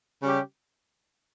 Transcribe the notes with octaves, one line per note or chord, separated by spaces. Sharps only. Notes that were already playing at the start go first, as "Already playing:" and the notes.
C#3 G3 C#4 G4